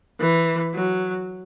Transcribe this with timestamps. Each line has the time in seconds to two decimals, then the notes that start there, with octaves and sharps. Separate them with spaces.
0.20 E3
0.74 F#3